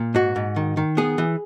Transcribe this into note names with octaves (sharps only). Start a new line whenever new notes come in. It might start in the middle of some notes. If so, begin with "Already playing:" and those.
Already playing: A#2
G#2 F#4
G#2
D#3
D#3
B3 G#4
E3